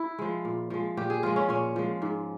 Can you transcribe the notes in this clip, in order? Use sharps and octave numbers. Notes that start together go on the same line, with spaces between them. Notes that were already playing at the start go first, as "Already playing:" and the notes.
Already playing: E4
F3 G#3
A#2
F3 G#3
A#2 G4
G#4
F3 G#3 F4
C#4
A#2 C#4
F3 G#3
G#2